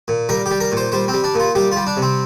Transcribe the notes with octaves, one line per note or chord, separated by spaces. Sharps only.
A#2
G3 A#4
G4
G3
A#4
A#2 C5
G3 C5
C4
G3
D4
A#2 F4
G3 G4
G3 F4
D4
C3
C4